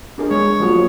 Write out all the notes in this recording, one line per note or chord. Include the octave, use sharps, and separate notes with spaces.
D4 G#4 A#4
G#3 C#5
F3 F#3 A#3